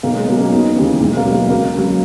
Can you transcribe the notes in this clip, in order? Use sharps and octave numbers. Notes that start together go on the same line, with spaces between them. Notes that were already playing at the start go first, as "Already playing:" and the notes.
B1 A#3
G#3
B2 F#3 A#3
A#3 C#4
E1 B3 D#4
D#2 C#3 E3
B1 G#3
A#3
B2 F#3
A#3
C#2 A#3
C#3 F#3